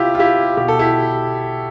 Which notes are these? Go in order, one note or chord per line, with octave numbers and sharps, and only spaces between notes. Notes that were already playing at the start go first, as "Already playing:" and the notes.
Already playing: C3 E4 F4 G4
F4
E4 G4
B2 G4
A4
E4 G4